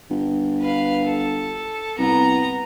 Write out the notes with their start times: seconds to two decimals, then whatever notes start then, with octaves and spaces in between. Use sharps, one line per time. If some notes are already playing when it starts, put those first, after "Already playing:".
0.10 G1
0.60 B4 F5
1.05 A4
1.99 C2 B3 A#5